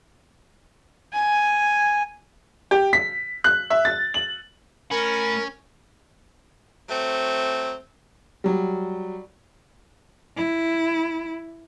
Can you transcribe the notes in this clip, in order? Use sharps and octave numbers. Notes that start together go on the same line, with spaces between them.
G#5
G4
B6
F#6
E5
A6
F#7
A3 C#4 A#4 B5
F#3 A3 C4
F#3 G3
E4